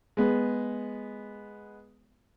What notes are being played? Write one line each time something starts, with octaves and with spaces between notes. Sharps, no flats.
G#3 B3